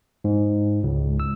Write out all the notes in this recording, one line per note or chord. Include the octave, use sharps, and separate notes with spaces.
G#2
C#2
E6